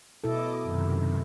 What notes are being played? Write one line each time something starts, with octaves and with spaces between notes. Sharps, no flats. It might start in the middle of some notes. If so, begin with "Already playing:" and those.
B2 E4 A4 D#5 D6
F#2 C3 D#3